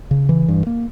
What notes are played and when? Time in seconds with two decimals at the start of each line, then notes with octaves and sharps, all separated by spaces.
0.11 C#3
0.29 E3
0.48 G2
0.67 A#3